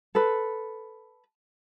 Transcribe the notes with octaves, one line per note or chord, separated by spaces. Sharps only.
A4 B4